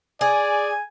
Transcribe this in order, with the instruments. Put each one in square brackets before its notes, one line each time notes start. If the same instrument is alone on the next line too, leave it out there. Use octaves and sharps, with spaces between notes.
[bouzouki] G#4 [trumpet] D5 [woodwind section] G#5